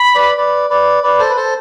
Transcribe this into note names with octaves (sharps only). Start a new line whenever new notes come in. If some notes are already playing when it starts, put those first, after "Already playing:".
Already playing: B5
B4 D5
B4 D5
B4 D5
B4 D5
A4 C5
B4
A4 C5